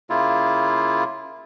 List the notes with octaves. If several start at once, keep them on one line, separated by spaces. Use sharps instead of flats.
C#3 A#3 E4 F4